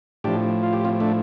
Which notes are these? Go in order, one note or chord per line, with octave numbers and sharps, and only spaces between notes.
A2 F3 D4 G4
F4
G4
C4 F4
A3 D4